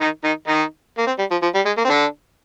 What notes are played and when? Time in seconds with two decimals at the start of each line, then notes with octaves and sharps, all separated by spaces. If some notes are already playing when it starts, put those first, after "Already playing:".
0.01 D#3 D#4
0.24 D#3 D#4
0.48 D#3 D#4
0.98 A#3
1.07 C4
1.18 G3
1.31 F3
1.42 F3
1.54 G3
1.65 G#3
1.77 A#3
1.85 C4
1.90 D3 D4